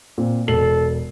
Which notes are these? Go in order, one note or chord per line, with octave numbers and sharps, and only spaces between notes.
A#2 C4
E1 A4 C7 F#7